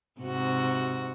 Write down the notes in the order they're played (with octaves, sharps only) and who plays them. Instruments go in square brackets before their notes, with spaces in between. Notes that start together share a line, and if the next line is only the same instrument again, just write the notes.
[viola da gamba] G#2 C3 F#4